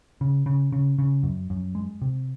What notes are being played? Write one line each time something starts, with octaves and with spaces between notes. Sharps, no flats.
C#3
C#3
C#3
C#3
F#2
F#2
G#3
C3